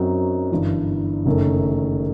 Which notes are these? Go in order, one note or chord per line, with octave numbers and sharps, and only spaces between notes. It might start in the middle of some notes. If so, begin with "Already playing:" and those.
Already playing: F#2 F#3 C4 D#4 F#4
G1 G2 E3
F#1 F#2 D#3 A3